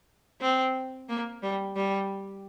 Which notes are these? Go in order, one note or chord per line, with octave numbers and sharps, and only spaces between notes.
C4
A#3
G3
G3